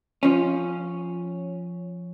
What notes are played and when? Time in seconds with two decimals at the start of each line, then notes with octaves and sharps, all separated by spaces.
0.23 F3 C#4